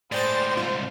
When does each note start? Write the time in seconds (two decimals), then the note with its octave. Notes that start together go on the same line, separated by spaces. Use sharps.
0.12 A2 G#3 C5 D5 G5 A6
0.57 C2 G#2 F4